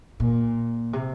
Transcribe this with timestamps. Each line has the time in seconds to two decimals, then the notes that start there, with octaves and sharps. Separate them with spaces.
0.20 A#2
0.93 C3